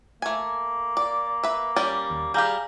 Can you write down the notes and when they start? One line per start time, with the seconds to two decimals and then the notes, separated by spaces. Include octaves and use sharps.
0.22 A3 A#3 G#5
0.97 D5
1.43 B4 E5
1.76 G3 C#4 D5
2.10 D#2
2.34 G3 G4 G#4 F5 A#5 G6